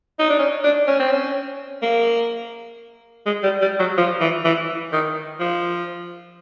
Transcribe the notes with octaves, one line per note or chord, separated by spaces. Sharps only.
D#4
D4
C#4
D4
C#4
C4
C#4
A#3
G#3
G3
G3
F#3
F3
E3
E3
D#3
F3